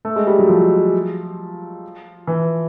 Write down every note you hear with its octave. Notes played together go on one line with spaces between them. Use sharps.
A3
G#3
G3
F#3
F3
E3